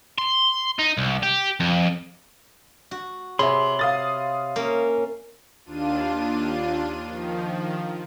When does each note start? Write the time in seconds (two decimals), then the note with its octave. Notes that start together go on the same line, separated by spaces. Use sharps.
0.18 C6
0.79 D#4
0.97 C2
1.23 G4
1.60 F2
2.91 F#4
3.39 C3 G#4 C#5 E5 B5 C6
3.79 F5 D#6 A6
4.56 A#3 C#4
5.66 D#2 D4 F4 D#7
7.05 D#3 F3